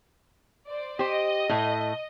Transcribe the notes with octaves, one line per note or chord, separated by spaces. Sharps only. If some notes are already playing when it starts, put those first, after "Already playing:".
C5 D5
G4 C5 D#5
A2 A3